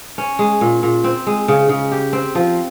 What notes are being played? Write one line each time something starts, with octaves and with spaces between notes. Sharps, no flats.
C#4
G#3
A#2
A#2
C4
G#3
C#3
C#3
G4
C4
F3